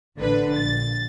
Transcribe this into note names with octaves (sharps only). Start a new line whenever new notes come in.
A1 D3 B4
A#1 A6